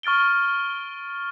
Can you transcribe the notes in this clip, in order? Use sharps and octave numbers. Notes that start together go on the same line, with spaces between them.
C#6 F6 A6 D7 G7